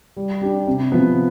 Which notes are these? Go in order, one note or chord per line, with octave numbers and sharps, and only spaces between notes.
G3
D4 G4
C3
F3 B3